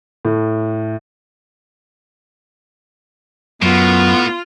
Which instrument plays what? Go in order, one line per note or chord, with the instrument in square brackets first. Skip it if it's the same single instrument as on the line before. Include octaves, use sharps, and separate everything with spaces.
[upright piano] A2
[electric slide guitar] F#2 [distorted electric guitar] A2 [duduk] B3 [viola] F4